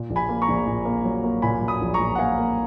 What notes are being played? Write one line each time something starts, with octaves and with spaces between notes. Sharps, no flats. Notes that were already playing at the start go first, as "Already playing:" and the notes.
Already playing: A#2
A#1
G#5 B5
A#3
A#5 C#6
A#1
A#2
A#3
F#3
A#3
A#2 G#5 B5
F#3
B5 D#6
A#1
A#5 C#6
A#2
F#5
A#3 F5 G#5
A#3